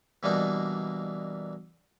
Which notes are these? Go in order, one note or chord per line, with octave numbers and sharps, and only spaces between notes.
B2 E3 G3 A#3 D4 D#4